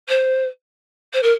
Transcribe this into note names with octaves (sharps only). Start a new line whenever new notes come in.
C5
C5
A#4